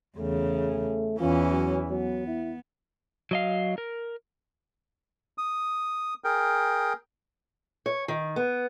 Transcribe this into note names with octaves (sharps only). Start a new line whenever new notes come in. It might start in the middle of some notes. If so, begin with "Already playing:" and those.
E2 C#3 A3
E2 E3 C#4 F4
F#3
F#3 B3
E4
F#3 D#5 F5
A#4
D#6
G#4 A#4 G5
C#5
D#3
B3